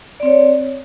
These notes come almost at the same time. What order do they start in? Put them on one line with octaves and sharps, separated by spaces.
D5 C4 C#5